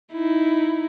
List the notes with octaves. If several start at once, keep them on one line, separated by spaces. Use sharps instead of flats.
D#4 E4